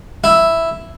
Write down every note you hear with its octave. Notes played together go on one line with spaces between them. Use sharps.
E4